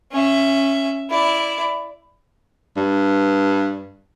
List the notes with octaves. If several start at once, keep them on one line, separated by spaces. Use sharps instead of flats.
C#4 E5
E4 D5
G2